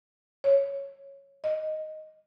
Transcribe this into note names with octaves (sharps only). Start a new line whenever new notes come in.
C#5
D#5